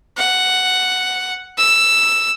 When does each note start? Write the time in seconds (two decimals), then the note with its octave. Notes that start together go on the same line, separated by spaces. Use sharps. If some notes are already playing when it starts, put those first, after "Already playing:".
0.17 F#5
1.58 E6